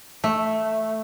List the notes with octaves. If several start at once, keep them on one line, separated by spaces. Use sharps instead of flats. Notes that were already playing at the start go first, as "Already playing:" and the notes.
A3